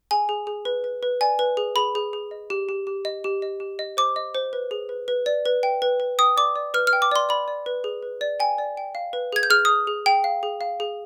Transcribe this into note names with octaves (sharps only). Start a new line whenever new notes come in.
G#4 G#5
G#4
G#4
B4
B4
B4
D5 G#5
B4
G#4
G#4 B5
G#4
G#4
D#5
G4
G4
G4
D#5
G4
D#5
G4
D#5
C5 D6
D#5
C5
B4
G#4
B4
B4
D5
B4
G5
B4
B4
G5 D#6
D5 D6
D5
B4 F6
F6
G5
D6
D5 C6
D5 B5
D5
B4
G#4
B4
D5
G5 G#5
D5
G5
F5
B4
G#4 G#6
G6
G#4 F6
G#4 D#6
G#4
G#4 G5
F5
G#4
F5
G#4